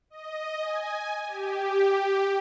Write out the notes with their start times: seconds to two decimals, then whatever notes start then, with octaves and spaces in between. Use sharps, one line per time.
0.10 D#5
0.60 G#5
1.26 G4